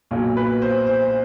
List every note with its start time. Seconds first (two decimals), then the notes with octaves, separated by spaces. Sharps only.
0.11 B1 A#2 F#3
0.37 B4
0.62 C5
0.87 C5